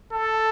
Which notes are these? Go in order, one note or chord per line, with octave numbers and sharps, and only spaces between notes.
A4